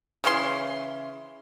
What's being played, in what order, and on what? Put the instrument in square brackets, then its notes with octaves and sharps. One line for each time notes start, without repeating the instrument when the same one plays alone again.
[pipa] C#3 E3 C#4 C6